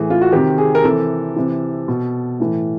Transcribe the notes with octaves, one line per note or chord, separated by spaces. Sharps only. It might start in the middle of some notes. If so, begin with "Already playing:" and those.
Already playing: A2 E3 G#4
F4
F#4
C3 D#3 G4
G#4
A#4
C3 E3 A4
C3 E3
B2
A2 E3